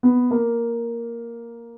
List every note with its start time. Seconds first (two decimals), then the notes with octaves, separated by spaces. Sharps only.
0.03 B3
0.31 A#3